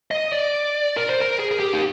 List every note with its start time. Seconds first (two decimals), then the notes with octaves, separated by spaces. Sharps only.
0.11 D#5
0.33 D5
0.97 A#4
1.09 C5
1.20 A#4
1.40 G#4
1.51 G#4
1.60 G4
1.73 D#4